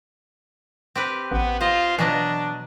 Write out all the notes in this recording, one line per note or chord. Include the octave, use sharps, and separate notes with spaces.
C4 G4 B4
A1 B3
F4 C5 D#5
B2 E3 F#3 D4 D#5